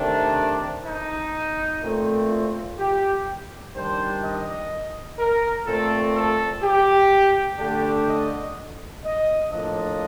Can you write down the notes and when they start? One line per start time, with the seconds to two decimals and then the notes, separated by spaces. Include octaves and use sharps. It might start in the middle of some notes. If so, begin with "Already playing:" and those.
Already playing: C3 D#3 A3 D4
0.86 D#4
1.81 A#2 A3 C4
2.30 F4
2.78 G4
3.74 D#3 G3 D4 C5
4.23 D#5
5.19 A#4
5.66 A#2 A3 C4 A4
6.15 A4
6.63 G4
7.59 D3 A3 D4 G4
8.07 D#5
9.04 D#5
9.52 A2 F3 A#3 D4 D#5